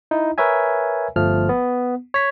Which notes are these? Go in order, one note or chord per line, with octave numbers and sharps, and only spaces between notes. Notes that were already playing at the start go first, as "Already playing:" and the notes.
D#4 E4
A#4 B4 C#5 E5 G#5
G1 F3 A3 F6
B3
C#5 B6